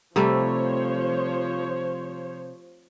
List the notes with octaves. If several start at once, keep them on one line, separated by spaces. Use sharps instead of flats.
C3 F3 G3 A3 C5 C#5